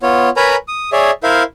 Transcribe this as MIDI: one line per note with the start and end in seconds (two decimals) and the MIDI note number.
0.03 0.29 59
0.03 0.29 65
0.03 0.29 73
0.37 0.56 70
0.37 0.56 71
0.37 0.56 73
0.37 0.56 80
0.37 0.56 82
0.37 0.56 83
0.68 0.90 87
0.92 1.11 68
0.92 1.11 73
0.92 1.11 74
0.92 1.11 76
1.23 1.43 64
1.23 1.43 70
1.23 1.43 72
1.23 1.43 76
1.23 1.43 77